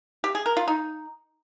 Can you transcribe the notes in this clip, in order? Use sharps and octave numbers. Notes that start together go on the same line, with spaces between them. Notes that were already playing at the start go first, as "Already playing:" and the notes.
G4
G#4
A#4
F4
D#4